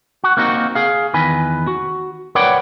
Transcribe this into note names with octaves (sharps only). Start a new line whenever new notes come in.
F#4
A#3 C4 D#4 F#4
G#4 F5
E2 D#3 B4 G#5
F#4
A#4 B4 C#5 D5 F#5 G5